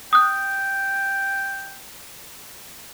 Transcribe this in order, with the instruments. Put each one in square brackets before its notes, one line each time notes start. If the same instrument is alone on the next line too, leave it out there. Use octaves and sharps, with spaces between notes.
[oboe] G5 [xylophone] D#6 F#6